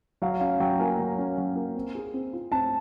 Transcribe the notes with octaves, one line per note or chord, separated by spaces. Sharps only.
F#3 F5
C#4 F5
F#3 G5
A#3 G#5
F#3
C#4
F#3
A#3
C4
G#4
C4
F4
C4 A5